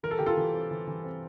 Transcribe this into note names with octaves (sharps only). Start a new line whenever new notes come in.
E3 A#4
A4
E3 G4
F4 A4
E3
C4
E3
E3
C4